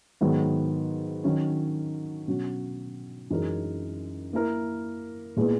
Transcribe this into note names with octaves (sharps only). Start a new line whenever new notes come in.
G#2 D#3 F#3 B3
D#3 F#3 C#4
B2 F#3 C#4 F#4
F#2 E3 G#3 D#4 A#4
A#3 E4 A#4
A#2 G#3 B3 E4 B4